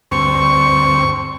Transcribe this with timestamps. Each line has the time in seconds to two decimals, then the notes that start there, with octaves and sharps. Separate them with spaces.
0.11 D2 G2 C4 C#6